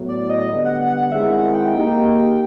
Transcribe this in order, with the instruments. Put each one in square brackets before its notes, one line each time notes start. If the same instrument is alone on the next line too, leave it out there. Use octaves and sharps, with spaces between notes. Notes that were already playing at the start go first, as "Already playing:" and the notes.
Already playing: [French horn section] A2 F#3 B3
[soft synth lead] D5
D#5
[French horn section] D3 G3 B3
[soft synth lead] F#5
F#5
F#5
[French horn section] D#3 G#3 C4 E4 G#4 [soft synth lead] E5
[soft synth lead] F#5
G5
[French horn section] A#3 D#4 G4